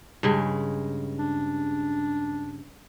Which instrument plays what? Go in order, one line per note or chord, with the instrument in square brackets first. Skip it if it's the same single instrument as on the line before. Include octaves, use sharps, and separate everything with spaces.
[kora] G2 C#3 G#3
[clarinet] D4